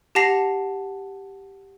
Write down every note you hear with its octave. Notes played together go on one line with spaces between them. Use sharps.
G4 F#5 A5 A#6 C7 F7